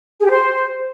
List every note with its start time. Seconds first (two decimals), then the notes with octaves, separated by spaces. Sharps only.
0.18 G#4
0.24 G4
0.30 C5